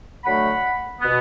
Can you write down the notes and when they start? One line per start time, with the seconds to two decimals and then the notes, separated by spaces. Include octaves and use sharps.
0.24 D3 F#3 A3 F#5 B5
1.01 B2 B3